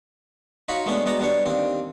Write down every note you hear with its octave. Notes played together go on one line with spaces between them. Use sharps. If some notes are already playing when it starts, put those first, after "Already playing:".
D#4 F4 F#4 C#5 B5
G#3 A3 B3 C#4 D4
G#3 B3 F#4 D5 A#5
G3 B3 D4 C#5
D#2 C4 D4